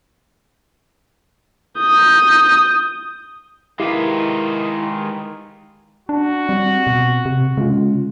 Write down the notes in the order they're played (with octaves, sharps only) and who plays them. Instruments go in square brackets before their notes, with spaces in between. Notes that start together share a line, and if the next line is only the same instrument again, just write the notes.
[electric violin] D#6 G6
[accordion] D#3 [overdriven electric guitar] G#3 B4 [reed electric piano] E4 [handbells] G4 F5
[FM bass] D4 [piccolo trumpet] F#4
[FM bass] G3 [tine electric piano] C4
[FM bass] B2
C3
[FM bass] C#3 [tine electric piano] G#3 F4